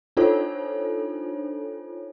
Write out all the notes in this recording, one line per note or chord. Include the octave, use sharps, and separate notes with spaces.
D4 D#4 F4 A4 C5 C#5